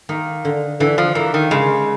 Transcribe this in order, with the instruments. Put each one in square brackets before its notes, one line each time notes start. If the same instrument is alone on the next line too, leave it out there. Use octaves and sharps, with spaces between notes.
[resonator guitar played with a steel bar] D#3 [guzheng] A#3
[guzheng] D3
[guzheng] D3 [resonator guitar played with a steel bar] E3
[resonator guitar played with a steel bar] F3
[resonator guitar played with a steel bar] E3 [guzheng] A#3
[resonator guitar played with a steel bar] D#3
[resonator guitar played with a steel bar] C#3 [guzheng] G#3